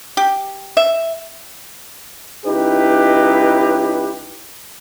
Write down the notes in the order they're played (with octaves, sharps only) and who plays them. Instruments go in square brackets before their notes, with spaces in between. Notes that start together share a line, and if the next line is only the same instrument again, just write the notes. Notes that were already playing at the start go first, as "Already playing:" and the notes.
[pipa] G4
E5
[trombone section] C#2 D#4 E4 G4 B4